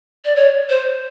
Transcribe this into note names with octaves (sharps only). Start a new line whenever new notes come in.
D5
C#5
C5